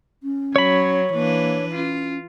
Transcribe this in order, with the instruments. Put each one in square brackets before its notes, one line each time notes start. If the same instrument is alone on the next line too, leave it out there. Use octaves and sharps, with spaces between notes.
[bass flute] C#4
[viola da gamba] F#3 [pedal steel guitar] C#5 B5
[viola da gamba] E3 D4 B4 [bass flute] A#3
[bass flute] C#4 [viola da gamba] F4